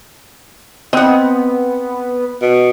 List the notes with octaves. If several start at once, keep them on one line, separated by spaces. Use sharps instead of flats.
B3 C4 D#5 F#5
B2